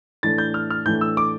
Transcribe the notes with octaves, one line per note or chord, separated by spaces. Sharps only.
A2 E3 A3 D4 A6
G6
F6
F6
A2 E3 A3 D4 G6
E6
D6